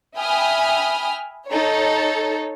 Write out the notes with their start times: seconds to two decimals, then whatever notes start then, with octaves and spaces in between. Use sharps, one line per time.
0.17 E5 G5 G#5 B5 D#6 F6
1.48 D#4 A4 C#5